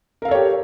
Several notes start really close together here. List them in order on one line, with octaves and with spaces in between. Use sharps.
A#4 F5 A4 C#5 G4